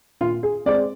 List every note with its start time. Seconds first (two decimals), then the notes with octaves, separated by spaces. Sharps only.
0.21 A#2 F4
0.43 G#4
0.66 G#3 C4 D5